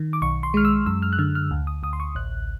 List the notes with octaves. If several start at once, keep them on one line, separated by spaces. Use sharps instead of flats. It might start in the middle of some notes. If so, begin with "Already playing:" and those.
Already playing: D#3
D6
B1 C#6
C6
G#3 F6
E6
F#2 E6
F6
F#6
D3 F6
F6
D2
D#6
D2 D#6
C6
C#6
A1 F#6